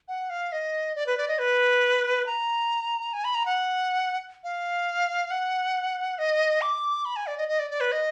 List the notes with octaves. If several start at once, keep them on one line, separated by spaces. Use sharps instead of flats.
F#5
F5
D#5
D5
B4
D5
D#5
B4
A#5
G#5
B5
A#5
F#5
F5
F#5
D#5
D6
B5
G#5
D5
D#5
D#5
D5
D5
B4
D#5